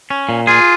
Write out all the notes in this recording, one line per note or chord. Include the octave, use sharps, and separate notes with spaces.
C#4
A#2
F4 G#4